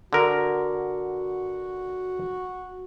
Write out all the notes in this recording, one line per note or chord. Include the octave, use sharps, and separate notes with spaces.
D3 F#4 A#4